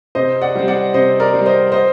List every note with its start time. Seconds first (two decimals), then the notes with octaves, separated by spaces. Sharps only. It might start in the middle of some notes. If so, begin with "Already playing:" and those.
0.15 C3 C5 D#5
0.41 D5 F#5
0.55 G3 C4
0.68 D5 F#5
0.94 C3 C5 D#5
1.20 A#4 D5
1.34 G3 C4
1.46 C5 D#5
1.72 C5 D#5